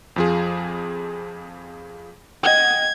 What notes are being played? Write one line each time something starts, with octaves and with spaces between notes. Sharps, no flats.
F2 F3 G#4
D#5 F#5 G5 G#6